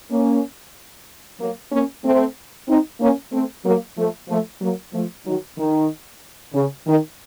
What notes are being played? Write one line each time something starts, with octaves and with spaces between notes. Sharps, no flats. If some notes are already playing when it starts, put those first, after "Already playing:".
A#3 C#4
F#3 A#3
A#3 C#4
A3 C4
C4 D#4
A#3 C#4
A3 C4
F#3 A#3
F3 A3
F3 A3
F#3 A#3
F3 A3
D#3 F#3
D#3
C#3
D#3